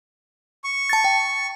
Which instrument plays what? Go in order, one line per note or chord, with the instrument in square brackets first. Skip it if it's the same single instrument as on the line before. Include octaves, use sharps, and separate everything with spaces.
[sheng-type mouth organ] C#6
[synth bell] A5 A6
G5